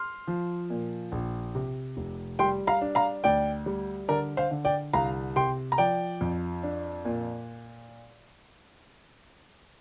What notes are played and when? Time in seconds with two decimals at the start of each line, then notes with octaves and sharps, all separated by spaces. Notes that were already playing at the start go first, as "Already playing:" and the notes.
Already playing: C6 F6
0.27 F3
0.70 A#2
1.12 A#1
1.55 C3
1.97 F1
2.39 G3 G5 C6
2.67 F5 A#5
2.81 D4
2.95 F5 A#5
3.24 D2 D5 G5
3.66 G3
4.08 D3 A#4 D5
4.37 C5 F5
4.51 D3
4.65 D5 G5
4.93 C2 F5 A#5
5.36 C3 G5 C6
5.72 A#5
5.78 F3 D5 G5
6.21 F2
6.63 D4
7.05 A#2